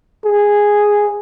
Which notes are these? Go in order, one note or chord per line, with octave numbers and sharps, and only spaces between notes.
G#4